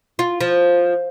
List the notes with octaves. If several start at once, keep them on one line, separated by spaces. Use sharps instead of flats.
F4
F3